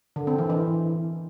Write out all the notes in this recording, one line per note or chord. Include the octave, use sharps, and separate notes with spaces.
D3
C4
E3
E3